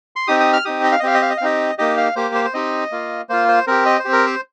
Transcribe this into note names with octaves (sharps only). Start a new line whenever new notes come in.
C6
C4 D#4 G4 D#6
D#6
F6
C4 D#4 G4 D#6
D#5
F5
D#5
C4 G4 F5
D#5
F5
D#5
F5
C4 D#4 G4 D#5
A#3 D#4 G4 D#5
F5
A#3 G4 C5
C5
C5
C4 D#4 G4 D#5
A#3 F4
A#3 F4 C5
C5
C4 G4 A#4
D#5
C5
C4 G4
A#4
C5